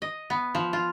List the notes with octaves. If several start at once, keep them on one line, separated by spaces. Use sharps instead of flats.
D#5
B3
F3
F4